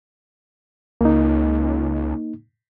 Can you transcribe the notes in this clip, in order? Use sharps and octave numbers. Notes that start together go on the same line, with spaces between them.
C#2 A#3 D#4